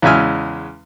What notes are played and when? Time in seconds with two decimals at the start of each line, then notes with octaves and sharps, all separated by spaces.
0.02 E2 C#3 G#3 E5 G#5 F6